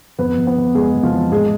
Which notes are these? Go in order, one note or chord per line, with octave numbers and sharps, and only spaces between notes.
F2 B3 B4
F2
B3 B4
F2
F2 G#3 G#4
F2
F3 F4
E3
A2 G#3 G#4